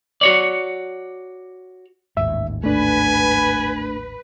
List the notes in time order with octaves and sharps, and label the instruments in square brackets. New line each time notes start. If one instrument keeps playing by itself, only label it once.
[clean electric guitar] F#4 C#5 D5
[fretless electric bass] A1 D#2 G#2 [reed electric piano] E5
[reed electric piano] A3 D4 [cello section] B4 [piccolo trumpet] G#5